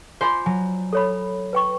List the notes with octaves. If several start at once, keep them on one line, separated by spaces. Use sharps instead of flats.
F4 C5 D5 G#5 B5 C6
F#3 G#5
A4 C#5 B5
B4 G5 C#6